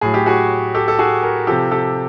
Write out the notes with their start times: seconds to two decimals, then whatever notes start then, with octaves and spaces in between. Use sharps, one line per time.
0.01 A2 F#3 G#4
0.14 G4
0.26 F#4 G#4
0.74 G4 A4
0.88 A4
0.99 F#4 G#4
1.23 G#4 A#4
1.47 C3 F3 G4 A4
1.71 G4 A4